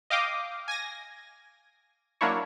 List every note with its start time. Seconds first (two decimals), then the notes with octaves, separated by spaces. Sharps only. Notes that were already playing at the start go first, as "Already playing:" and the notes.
0.10 D#5 F5 G5 D6 D#6
0.68 G#5 G#6 A#6
2.21 F#3 A#3 D4 E4 C#5